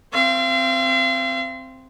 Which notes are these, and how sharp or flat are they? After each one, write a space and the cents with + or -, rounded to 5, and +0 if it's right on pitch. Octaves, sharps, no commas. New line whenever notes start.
C4 -5 F5 -40